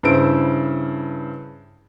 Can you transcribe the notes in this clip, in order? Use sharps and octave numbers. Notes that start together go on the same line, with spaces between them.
G2 C#3 E4 C5 E6 D7